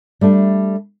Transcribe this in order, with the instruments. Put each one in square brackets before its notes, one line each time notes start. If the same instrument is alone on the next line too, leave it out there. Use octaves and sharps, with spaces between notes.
[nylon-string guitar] G3 A3 D4